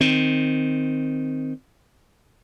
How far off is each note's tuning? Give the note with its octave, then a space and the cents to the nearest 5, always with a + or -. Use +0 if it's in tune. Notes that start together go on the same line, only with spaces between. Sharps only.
D#3 -5 C4 +0